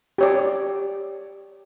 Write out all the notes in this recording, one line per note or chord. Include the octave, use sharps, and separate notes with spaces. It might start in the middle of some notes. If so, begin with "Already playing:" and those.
G4 C#5 D5